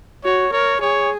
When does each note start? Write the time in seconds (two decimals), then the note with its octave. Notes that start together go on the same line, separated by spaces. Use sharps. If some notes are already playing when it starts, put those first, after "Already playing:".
0.24 F#4 C#5
0.53 A#4 C#5
0.81 G#4 C#5